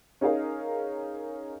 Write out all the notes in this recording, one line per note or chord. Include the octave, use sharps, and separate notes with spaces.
C#4 D#4 G#4 A#4 F5